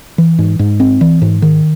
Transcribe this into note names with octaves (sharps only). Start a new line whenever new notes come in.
E3
G#2
G#2
C4
E3
G#2
D#3